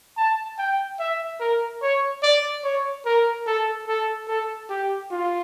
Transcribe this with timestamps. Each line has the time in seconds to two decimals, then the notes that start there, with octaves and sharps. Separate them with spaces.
0.17 A5
0.58 G5
0.99 E5
1.40 A#4
1.82 C#5
2.23 D5
2.64 C#5
3.06 A#4
3.47 A4
3.87 A4
4.28 A4
4.69 G4
5.11 F4